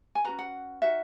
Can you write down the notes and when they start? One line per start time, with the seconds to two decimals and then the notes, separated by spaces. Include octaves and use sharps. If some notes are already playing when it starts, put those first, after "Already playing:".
0.15 G#5
0.25 C#4 F#4 B4 A#5
0.39 F#5
0.82 D#4 F#4 A#4 E5